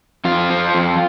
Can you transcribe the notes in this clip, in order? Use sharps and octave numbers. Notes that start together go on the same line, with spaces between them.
F2 F4
F3
F2